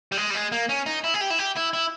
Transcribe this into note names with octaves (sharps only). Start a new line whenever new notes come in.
G3
G#3
G3
G#3
A#3
C#4
D#4
E4
G#4
G4
E4
G4
E4
E4